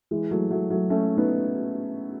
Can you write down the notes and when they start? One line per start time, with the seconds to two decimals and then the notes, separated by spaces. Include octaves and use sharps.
0.11 E3 G#3
0.31 F#3 A3
0.51 F#3 A3
0.70 F#3 A3
0.90 A3 C#4
1.17 B3 D#4